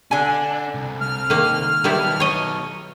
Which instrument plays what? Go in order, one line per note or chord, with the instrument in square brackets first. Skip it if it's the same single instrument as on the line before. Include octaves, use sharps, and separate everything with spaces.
[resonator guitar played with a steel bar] D3 G#5 [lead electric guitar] D4
[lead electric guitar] C2
[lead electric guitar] C2 [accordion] F6
[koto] D#3 A#3
[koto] D#3 G3 E4 [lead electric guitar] F#3 B3
[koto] C#5 D#5